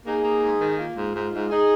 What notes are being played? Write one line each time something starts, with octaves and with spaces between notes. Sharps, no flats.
A#3 D#4 G#4
A#3
G#2
D#3
A#3 F4
G#2
G#2
G#2
D#4 G#4